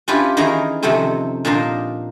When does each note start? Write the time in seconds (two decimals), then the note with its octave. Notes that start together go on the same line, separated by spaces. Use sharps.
0.08 C#4 D4 E4 F4 G4 B4
0.37 D#3 E3 D#4 G#4 A#4 A#5
0.82 F2 C3 D#3 A3 C4 C#4
1.45 A#2 D4 D#4 A#4 C5